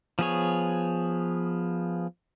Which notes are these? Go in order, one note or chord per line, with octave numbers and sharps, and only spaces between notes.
F3 B3 G#4 C#5